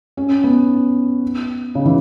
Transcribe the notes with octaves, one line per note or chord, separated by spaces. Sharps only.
C#4
B3
C#3
E3